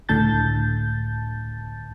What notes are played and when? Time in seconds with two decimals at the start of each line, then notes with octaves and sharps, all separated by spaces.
0.09 C#2 A2 D3 A5 G6 A6